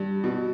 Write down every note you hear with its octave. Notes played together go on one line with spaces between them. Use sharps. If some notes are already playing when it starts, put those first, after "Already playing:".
Already playing: G2
B2